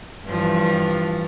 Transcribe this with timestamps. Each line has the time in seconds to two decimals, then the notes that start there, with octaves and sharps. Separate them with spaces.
0.26 G2 E3 F3